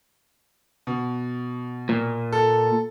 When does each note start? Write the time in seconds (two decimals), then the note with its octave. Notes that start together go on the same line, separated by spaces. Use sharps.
0.87 B2
1.89 A#2
2.32 A4